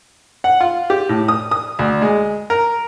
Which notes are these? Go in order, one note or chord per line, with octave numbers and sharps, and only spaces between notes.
F#5
F4
G4
A2
D#6
D#6
D2
G#3
A#4